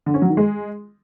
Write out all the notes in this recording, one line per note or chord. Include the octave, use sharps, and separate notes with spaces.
D3
C#4
F#3
D#3
G#3